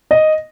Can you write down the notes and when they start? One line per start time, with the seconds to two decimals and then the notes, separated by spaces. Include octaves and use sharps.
0.11 D#5